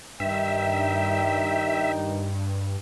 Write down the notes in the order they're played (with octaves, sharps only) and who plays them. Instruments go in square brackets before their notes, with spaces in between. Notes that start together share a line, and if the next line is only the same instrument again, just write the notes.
[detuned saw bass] G2 [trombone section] D#3 G3 D#4 [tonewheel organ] E5 [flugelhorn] G5